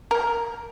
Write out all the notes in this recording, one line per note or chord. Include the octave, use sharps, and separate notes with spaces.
A#4